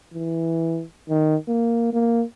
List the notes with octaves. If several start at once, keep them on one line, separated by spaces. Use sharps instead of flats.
E3
D#3
A#3
A#3